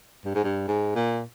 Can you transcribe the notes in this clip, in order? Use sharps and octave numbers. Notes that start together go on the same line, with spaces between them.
G2
G#2
G2
G#2
A#2